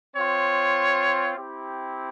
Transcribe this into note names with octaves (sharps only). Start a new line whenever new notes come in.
C4 F4 C#5
C4 E4 G4